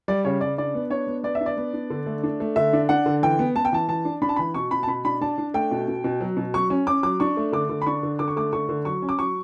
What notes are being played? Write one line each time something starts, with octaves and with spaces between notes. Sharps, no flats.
G3 D5
C#3 C#5
C#3 D5
D4 D5
B3
D4 C#5
B3
B3 D5
E5
D4
D5
B3
D4
D3
A3
D4
A3
D3 E5
D4
D4 F#5
D3
E3 G5
B3
B3 A5
G5
E3 A5
E3 A5
D4
D4 B5
A5
E3 B5
B2 C#6
B2 B5
A5
B2 B5
D4 B5
D4 A5
D4
A3 G5
B2
B2
B2
F#3
B2
F#3 C#6
C#4
C#4 D6
F#3 D6
D4 C#6
A3
D3 D6
D3
B5
D4 C#6
D3
D3 D6
C#6
A3 D6
D3 C#6
D3
F#3 C#6
C#4
D6
F#3 C#6